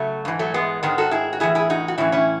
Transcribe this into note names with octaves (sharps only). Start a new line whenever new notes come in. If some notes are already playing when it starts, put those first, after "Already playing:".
Already playing: C#3 F#3 A3
G#2 E3
F#3 A3
G#3 B3
G#2 D#3 G#3 B3
F#4 A4
E4 G#4
F#4
A2 E3 E4 G#4
E4 G#4
D#4 F#4
F#4
A2 E3 C#4 E4
C#4 E4